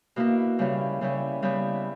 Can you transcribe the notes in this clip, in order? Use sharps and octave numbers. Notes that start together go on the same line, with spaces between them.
B2 A#3 E4
C#3 G3 C#4 E4
C#3 G3 C#4 E4
C#3 G3 B3 E4